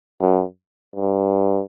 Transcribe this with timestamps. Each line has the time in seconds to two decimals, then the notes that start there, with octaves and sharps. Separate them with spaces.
0.20 F#2
0.95 G2